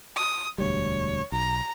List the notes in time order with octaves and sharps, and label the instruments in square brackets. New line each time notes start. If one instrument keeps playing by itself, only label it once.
[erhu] D#6
[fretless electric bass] E1 D2 G3 [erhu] C#5
[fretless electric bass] B1 [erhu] A#5